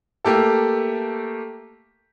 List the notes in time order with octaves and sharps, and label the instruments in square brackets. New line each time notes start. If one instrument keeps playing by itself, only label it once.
[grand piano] A3 A#3 G4 A4